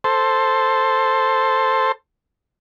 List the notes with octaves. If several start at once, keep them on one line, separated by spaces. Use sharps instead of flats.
A4 C5